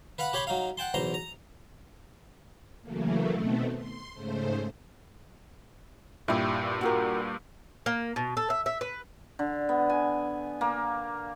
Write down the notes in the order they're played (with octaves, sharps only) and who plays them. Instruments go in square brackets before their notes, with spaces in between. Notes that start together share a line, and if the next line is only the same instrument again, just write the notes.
[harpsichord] B4 F5 F#5 B5
G4 C#5 B5 C6
F#3 D#4 F5
F#5 G5 A5 C6
B1 E2 C5 A#5 C6
A#5
[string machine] C#3 E3 F#3 A3 A#3
B2 D#3 A3 B3 C4
C6
G#2 C#3 A3 C5
[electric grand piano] G2 A#2 [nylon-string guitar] E4 G4
[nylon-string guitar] F#4 G4 A#4
[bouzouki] A#3
B2
A4
E5
E5
B4
[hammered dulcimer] D3
B3
G#5
A#3